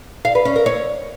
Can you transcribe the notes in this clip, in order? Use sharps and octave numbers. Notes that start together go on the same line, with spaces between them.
F5
B4
C#4
A#4
C#5